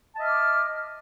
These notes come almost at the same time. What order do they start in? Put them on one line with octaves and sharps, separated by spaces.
A5 D#5 E5 F6 D6